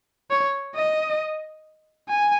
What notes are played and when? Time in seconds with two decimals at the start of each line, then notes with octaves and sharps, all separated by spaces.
0.30 C#5
0.75 D#5
2.08 G#5